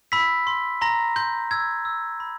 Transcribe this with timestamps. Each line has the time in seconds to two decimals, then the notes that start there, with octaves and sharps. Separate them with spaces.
0.12 B5 E6 B6
0.47 C6
0.81 A#5 C6 A#6
1.16 C6 G6
1.51 E6 G#6
1.85 E6
2.20 B5